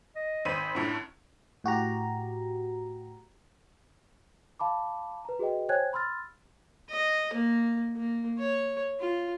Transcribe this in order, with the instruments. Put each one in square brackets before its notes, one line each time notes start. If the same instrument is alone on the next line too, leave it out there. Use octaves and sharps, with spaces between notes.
[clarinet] D#5
[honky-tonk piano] G#1 C5 D#7 [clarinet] B5
[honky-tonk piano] F#2 A2 D3
[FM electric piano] A2 F#4 G4 A#5
[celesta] F5 A5 B5 D6
B4 A#5
F#4 G#4 B4 D#5 G5
C5 C#5 G5 G#5 F#6 G#6
B5 C6 E6 F6 A6
[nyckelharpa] D#5
A#3
A#3
C#5
F4